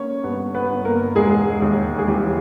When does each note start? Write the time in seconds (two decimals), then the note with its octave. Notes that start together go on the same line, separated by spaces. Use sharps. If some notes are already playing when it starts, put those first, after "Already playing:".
Already playing: A#3 C#4 C#5
0.24 G2 B3 B4
0.55 B3 B4
0.70 G1
0.85 A#3 A#4
1.15 E1 G#3 G#4
1.62 D#2
1.98 G#4
2.08 E3 G3 G4